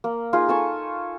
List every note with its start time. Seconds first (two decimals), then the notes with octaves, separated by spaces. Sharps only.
0.04 A#3
0.33 D#4 F4 G#4
0.49 A4 G#5 C#6